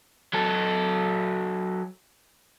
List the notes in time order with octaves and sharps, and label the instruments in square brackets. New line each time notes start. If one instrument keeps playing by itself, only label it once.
[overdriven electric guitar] F#3 A4